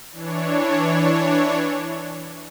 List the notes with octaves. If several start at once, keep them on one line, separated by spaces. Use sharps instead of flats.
E3 D4 C#5